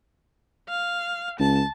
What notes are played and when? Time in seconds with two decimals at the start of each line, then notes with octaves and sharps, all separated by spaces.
0.69 F5
1.40 C#2 A5